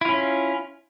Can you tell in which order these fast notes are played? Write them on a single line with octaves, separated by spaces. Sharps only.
E4 F4 C#4